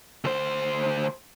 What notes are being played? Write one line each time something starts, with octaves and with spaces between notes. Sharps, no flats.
D2 C5